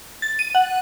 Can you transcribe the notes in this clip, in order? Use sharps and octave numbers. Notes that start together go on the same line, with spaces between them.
A6
D#7
F#5